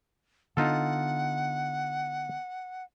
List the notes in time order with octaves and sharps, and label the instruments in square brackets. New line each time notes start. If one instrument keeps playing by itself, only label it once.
[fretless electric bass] D3 B3 D4 [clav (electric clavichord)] D#4 F4 A4 [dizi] F#5